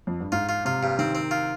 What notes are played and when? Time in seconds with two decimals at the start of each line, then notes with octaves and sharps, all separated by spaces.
0.07 F2
0.20 G2
0.32 G#2 F4
0.49 F4
0.65 C3 F4
0.83 G2
0.98 D#3 C4
1.15 C4
1.31 F4